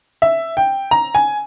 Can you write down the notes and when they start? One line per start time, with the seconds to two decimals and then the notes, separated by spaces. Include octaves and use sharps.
0.22 E5
0.57 G5
0.91 A#5
1.15 G#5